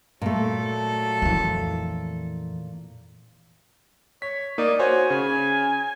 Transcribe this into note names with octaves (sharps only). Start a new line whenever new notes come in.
A#2 F#3 A3 A4
F2 E3
C#5 B6
A#3 D#4 D5
F#4 C5 C#5 G#5
C#3